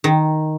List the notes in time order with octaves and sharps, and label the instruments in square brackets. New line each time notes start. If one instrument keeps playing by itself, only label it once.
[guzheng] D#3